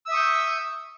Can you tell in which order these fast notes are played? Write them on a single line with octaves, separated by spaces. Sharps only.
E6 E5 D#6 C#6 G6